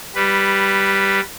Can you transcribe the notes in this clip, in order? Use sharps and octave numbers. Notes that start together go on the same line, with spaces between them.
G3 B4